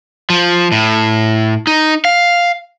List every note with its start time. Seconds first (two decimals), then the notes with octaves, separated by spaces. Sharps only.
0.30 F3
0.72 A2
1.67 D#4
2.05 F5